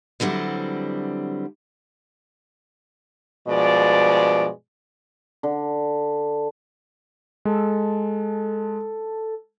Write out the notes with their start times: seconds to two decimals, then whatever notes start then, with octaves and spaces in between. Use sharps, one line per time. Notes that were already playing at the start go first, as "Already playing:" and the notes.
0.20 D3 E3 F#3 G3 C4
3.48 G2 B2 F3 G#3 D5
5.43 D3
7.45 G#3 A4